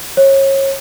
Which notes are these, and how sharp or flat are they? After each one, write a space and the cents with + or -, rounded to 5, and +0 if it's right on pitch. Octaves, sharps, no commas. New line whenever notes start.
C#5 -30